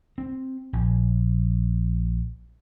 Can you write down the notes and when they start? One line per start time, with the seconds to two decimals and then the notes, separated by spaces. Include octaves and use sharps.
0.18 C4
0.73 A#1